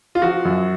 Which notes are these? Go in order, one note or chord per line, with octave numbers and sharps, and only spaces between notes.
F4
F3 F#4
F#2